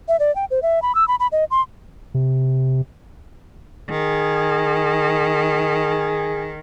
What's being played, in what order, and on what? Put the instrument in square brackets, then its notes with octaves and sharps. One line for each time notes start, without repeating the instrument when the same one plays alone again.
[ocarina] E5
D5
G5
C5
E5
B5
E6
B5
B5
D#5
C6
[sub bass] C3
[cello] D#3 [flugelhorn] G#4